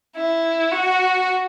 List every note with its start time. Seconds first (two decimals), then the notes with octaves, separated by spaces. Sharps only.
0.16 E4
0.72 F#4